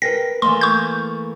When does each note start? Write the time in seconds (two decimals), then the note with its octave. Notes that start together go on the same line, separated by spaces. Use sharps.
0.02 A#4 B4 G5 A#6
0.42 E3 A3 A#3 C6
0.61 C#6 G6